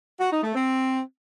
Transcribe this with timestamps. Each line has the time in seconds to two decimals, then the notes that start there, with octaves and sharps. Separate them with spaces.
0.20 F#4
0.31 D#4
0.42 A3
0.54 C4